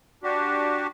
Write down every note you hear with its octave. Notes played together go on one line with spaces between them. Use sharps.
D4 F#4 G4